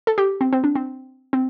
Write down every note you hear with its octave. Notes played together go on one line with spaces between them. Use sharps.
A4
G4
C4
C4
D4
C4
C4